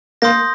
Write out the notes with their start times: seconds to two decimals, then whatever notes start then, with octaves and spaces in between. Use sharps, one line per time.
0.22 A#3 C6 D#6 G6 A#6